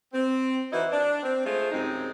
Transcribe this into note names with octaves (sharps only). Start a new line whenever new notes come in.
C4
E3 D#4 E4 F#4 C5
D4
C4
G#3 A3 F4 C5
F#2 C3 G#3 C4 D#4